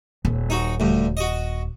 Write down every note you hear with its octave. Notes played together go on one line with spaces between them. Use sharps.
D#1
D#4 F#4
D2 G2
F#4 D#5